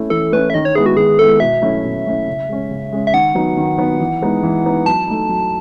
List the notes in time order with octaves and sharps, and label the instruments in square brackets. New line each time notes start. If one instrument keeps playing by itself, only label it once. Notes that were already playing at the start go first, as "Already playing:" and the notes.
Already playing: [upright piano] A3 C#4 E4
[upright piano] E3 [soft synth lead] A4
[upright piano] A3 C#4 E4 [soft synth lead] B4
[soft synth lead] E5
[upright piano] D#3 [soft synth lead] D#5
[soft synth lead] C#5
[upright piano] G#3 B3 E4 [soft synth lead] G#4
[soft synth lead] F#4
[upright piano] D#3 [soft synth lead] G#4
[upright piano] G#3 B3 E4 [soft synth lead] A4
[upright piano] B2 [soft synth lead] E5
[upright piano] F#3 A3 C#4 E4
B2
F#3 A3 C#4 E4
C#3
G#3 C#4
C#3
G#3 C#4
[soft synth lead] E5
[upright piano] D#3 [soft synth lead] F#5
[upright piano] F#3 B3 D#4
D#3
F#3 B3 D#4
E3
G#3 B3 D#4
E3
G#3 B3 D#4
[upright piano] F#3 [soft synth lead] A5
[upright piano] A3 D#4
F#3